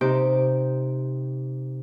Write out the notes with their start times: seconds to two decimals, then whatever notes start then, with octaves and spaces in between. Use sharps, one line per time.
0.01 C3 D#4 G4 G5